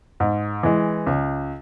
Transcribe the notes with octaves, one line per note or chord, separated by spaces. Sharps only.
G#2
E3 G#3
C#2